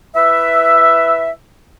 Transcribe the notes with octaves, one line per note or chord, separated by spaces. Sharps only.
E4 B4 E5